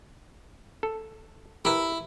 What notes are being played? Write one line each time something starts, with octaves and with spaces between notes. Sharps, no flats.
A4
E4 G4 A#4 B4